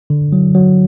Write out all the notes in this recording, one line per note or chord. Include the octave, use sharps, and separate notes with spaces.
D3
F#3
F#3